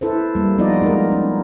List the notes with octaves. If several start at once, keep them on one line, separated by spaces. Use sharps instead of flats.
E4 A4 B4 C5
G3 A#3
F3 B3 D#4 F4 D5 D#5
G#3 D#4 A#4
C#4